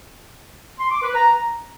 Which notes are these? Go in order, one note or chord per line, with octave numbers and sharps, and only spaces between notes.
C6
D6
B4
A#5